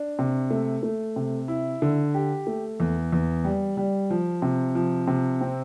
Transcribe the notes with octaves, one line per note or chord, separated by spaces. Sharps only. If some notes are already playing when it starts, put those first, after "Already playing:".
Already playing: D4
C3
A3
A3
C3
E4
D3
G4
A3
E2
E2
G3
G3
F3
C3
F3
C3
C4